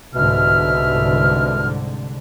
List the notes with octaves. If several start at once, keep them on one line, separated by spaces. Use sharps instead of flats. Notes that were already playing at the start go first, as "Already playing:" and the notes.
C2 G#2 B2 D3 E5 F6